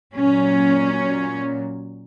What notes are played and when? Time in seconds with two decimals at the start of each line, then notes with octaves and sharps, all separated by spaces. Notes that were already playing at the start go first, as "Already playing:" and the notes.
0.15 A#2 F#3 C#4